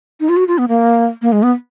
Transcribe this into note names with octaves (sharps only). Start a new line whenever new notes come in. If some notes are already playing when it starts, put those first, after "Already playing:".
D#4
F4
F#4
F4
B3
A#3
A#3
G#3
B3